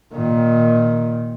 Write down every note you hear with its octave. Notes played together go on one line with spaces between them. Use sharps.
A#2 D#3